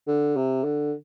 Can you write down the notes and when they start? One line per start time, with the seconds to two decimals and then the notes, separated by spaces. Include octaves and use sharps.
0.07 D3
0.36 C3
0.64 D3